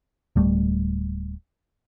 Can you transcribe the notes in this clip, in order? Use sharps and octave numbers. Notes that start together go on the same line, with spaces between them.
D1 G3 A3